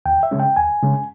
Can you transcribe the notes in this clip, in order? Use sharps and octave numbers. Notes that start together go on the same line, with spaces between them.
D#2 G5
E5
C#3 G#3 C#4
G5
D#2 G#5
C#3 G#3 C#4